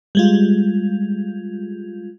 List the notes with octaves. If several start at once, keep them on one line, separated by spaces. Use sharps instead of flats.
G3 G#3 F4